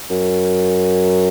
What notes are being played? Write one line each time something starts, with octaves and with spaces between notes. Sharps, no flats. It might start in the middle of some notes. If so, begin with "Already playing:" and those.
F#2